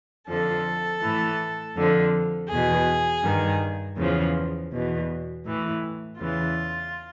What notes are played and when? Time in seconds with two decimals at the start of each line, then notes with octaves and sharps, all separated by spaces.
0.28 F2 D3 F3 A4
1.02 A2 E3
1.75 F2 D3 F3
2.49 E2 B2 G#4
3.24 G2 D#3
3.97 E2 C#3 F3
4.72 E2 B2
5.45 A2 E3
6.19 E2 C#3 E3 F4